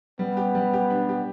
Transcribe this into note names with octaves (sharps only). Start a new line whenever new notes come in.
G3 B3
G4
G3
G4
D4
G4